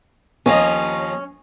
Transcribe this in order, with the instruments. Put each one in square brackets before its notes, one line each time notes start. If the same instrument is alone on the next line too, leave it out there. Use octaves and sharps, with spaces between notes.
[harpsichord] D#2 F3 D#5 [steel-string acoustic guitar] C#4